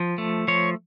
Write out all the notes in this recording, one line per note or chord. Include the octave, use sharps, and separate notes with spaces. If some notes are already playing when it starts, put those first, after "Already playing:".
Already playing: F3
A3
F3 C#5